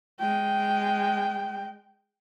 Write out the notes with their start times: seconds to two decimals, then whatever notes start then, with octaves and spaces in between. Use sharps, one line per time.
0.19 G#3 G5